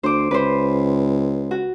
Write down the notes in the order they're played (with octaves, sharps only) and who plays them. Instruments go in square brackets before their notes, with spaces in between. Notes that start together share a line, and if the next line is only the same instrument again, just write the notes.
[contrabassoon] D2 [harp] C5 D6
[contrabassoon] C#2 [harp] B4 C5
[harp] F#4